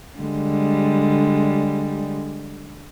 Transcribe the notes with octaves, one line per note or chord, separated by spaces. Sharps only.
D3 G3 G#3